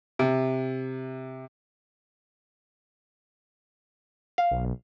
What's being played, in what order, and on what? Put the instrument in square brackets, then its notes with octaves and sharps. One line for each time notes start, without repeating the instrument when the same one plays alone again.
[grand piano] C3
[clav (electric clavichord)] F5
[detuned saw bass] B1